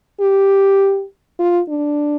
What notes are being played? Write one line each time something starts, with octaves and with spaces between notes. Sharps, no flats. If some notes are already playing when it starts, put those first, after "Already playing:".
G4
F4
D4